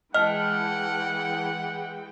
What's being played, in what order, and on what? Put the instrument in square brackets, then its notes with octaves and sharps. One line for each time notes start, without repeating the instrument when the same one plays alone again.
[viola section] E3 G#3 G5 [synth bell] D#5 [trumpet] F#5 [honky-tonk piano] A5 F6